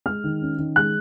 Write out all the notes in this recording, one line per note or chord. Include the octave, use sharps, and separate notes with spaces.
G#3 F6
D#3
C#4
D#3
G#3 F#6